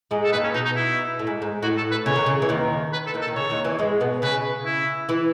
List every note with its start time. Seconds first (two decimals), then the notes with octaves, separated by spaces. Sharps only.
0.11 G#2 G#3
0.24 A4
0.33 D#2 D#3 B4
0.44 C#4
0.54 B2 D#4
0.65 D#4
0.76 E4
1.19 A2
1.27 G#2
1.42 G#2
1.63 A2 F#4
1.77 A4
1.91 B4
2.06 C#3 C#5
2.16 D#3
2.26 C#3
2.42 E3
2.49 D#2 D#3
2.93 B4
3.07 A4
3.14 D#2 D#3
3.21 A4
3.28 D#3
3.35 C#3 C#5
3.50 D#2 D#3
3.64 E2 E3
3.79 G#2 G#3
4.00 B2 B3
4.22 C#3 C#4 B4
4.65 E4
5.09 E3 E4